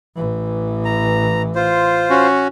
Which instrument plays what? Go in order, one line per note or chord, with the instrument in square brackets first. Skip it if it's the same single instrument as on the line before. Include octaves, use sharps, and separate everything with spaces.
[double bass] A1 E3
[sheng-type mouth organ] A#5
F4 C5
[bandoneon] C#4 F#4